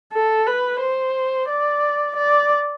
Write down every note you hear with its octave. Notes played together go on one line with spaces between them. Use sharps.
A4
B4
C5
D5
D5